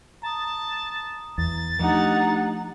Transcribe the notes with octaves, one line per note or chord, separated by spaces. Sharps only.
A5 A#5 D#6
E2 A6
F3 A3 D4 D#4 G4 F#5